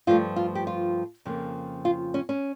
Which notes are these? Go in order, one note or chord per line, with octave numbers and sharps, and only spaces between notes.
G2 F3 A3 F4
F4
G4
F4
F2 C#3 F3 A#3
F4
C#4
C#4